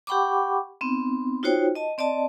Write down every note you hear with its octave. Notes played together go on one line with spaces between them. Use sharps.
G4 F#5 G5 B5 C#6 D6
B3 C4 D#4
D#4 F4 F#4 C5 C#5 G5
D#5 A5
C4 D5 D#5 A5